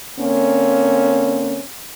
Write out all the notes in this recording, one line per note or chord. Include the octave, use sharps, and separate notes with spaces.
D3 A#3 C4 C#4